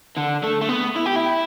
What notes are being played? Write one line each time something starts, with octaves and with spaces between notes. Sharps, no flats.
D3
A3
A3
B3
E4
G4
E4